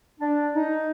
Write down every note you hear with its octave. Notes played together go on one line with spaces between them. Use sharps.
D4
D#4